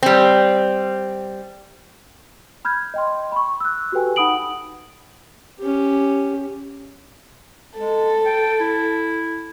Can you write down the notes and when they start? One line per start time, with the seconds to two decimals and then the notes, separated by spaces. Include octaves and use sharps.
0.03 G3 C4
2.65 B5 F6 G6 G#6
2.94 D#5 G5 C6
3.32 B5 C#6
3.60 E6 F#6
3.92 F#4 G4 A4 B4 G5 G#5
4.16 D#4 F#5 B5 D#6 D7 F#7
5.59 C#4 G4
7.77 G#3 A4
8.26 G5
8.60 E4